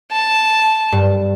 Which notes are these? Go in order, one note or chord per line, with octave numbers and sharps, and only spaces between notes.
A5
G2